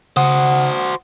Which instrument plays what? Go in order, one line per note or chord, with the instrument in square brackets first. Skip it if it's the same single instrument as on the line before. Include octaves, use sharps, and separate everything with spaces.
[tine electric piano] C#3 [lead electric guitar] F#4 C5 [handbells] F#5 D#6